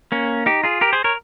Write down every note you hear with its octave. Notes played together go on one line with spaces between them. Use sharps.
A#3 C#4
D#4 G4
F4 G#4
G4 A#4
G#4 C5
A#4 C#5